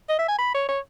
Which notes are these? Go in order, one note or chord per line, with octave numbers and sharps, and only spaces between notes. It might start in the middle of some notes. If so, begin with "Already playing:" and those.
D#5
E5
G#5
B5
C#5
C#5